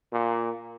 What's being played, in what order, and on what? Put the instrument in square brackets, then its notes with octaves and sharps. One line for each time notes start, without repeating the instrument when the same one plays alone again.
[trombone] A#2